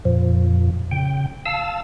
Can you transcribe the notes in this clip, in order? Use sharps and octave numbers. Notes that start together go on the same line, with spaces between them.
F2 A#2 F3
C#3 G5
F5 A5 E6